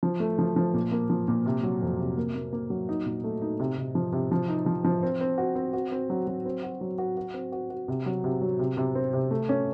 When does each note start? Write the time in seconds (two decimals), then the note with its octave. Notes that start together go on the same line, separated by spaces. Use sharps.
0.03 F3
0.20 A3
0.39 F3
0.56 F3
0.74 A#2
0.92 A#3
1.10 F3
1.28 A#2
1.46 C3
1.63 F#3
1.82 F2
1.99 C3
2.17 A#3
2.35 A#3
2.53 A#3
2.70 F#3
2.89 D#4
3.06 A#2
3.24 A3
3.42 D#4
3.60 C3
3.78 C3
3.95 F3
4.13 C3
4.32 F3
4.48 D#4
4.66 F3
4.84 F3
5.03 C4
5.21 C4
5.38 F#4
5.55 C4
5.73 F#4
5.92 C4
6.10 F#3
6.27 F#3
6.45 C4
6.63 F#4
6.81 F#3
6.98 F#4
7.17 F#4
7.34 C4
7.52 F#4
7.70 F#4
7.88 C3
8.06 F#3
8.24 C3
8.41 F#3
8.59 C3
8.77 C3
8.95 C4
9.13 C3
9.31 A3
9.49 C#4